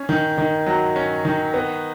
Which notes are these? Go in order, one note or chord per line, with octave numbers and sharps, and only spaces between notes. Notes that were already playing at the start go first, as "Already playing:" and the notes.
Already playing: C#4
D#3
D#3
F#3
C#4
D#3
B3